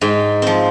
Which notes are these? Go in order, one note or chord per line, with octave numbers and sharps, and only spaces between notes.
G#2 G5
F3 C4